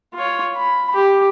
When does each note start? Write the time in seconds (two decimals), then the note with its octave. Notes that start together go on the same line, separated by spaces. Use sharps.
0.14 F4 C#5
0.56 B5
0.94 G4